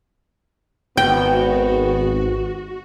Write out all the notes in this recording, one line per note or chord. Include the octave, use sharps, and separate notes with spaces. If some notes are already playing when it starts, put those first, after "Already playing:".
G#1 B3 F#4 G5